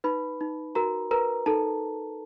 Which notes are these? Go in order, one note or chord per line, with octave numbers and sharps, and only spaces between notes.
D#4 B4 B5
D#4
F#4 A#4 A#5
A#4 B4 A#5
D#4 A4 A5